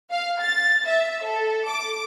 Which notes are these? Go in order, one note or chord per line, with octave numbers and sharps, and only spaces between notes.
F5
A6
E5
A4
D6